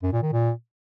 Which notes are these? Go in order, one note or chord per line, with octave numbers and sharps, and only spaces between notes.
F#2
A#2
D#3
A#2